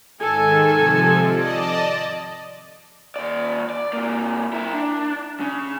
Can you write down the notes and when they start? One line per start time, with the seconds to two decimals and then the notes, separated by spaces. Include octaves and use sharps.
0.21 G#2 D#3 A4 G#5
0.73 C3 F3
1.27 D5 D#5 A5
3.16 D#2 D5
3.70 D5
3.93 C3 A#3
4.53 E4 A#4
4.73 D4
5.40 C#3